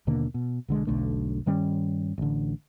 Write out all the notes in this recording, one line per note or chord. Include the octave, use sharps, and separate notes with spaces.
D#2 B2 D3 A#3
B2
B1 D3 G#3
E1 B1 D3 A3
G2 D#3 G3 C#4
A1 D3